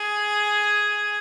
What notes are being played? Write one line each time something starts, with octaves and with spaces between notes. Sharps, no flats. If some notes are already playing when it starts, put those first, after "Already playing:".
Already playing: G#4